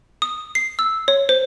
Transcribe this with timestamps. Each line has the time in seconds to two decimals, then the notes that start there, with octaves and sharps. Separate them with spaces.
0.22 D#6
0.55 C7
0.79 E6
1.08 C#5
1.29 C5